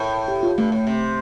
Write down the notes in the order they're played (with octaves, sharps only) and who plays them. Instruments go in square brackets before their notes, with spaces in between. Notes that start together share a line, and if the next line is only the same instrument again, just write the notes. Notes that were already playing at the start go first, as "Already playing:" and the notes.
Already playing: [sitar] A2 [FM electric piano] A#4
[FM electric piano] G4
F4
[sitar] G2 [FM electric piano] A3
[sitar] A2
C3